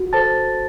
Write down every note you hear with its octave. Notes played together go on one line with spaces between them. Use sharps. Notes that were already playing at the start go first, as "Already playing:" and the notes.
Already playing: F#4
A4 C5 A5 A6